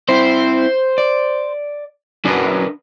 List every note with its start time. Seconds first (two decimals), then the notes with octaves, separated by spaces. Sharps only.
0.09 C4 E4 C5
0.98 D5
2.25 F#2 D4 A#4 B4